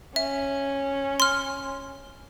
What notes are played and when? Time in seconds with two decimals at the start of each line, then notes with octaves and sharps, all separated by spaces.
0.16 C#4 E5
1.20 C6 F6